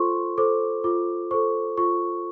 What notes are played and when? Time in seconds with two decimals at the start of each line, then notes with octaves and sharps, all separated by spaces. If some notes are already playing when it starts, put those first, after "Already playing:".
Already playing: F4 A4 C5 C6 C#6
0.38 A4 C5 D6
0.84 F4 D6
1.31 A4 C5 C#6
1.77 F4 C#6